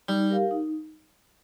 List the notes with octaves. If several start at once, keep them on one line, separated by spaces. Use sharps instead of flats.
G3 D#4
G4 A#4 F5
D#4